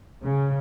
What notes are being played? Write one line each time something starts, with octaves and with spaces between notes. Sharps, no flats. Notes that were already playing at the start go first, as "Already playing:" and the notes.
C#3